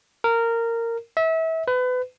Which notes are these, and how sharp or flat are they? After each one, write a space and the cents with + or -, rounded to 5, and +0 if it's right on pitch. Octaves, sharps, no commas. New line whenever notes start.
A#4 -15
E5 -30
B4 +30